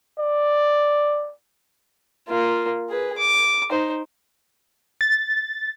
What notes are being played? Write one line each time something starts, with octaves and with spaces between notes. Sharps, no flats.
D5
A#3 F4
G#4 B4
D6
D#4 C5
A6